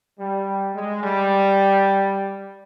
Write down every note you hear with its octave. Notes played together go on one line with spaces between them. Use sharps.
G3
G#3
G3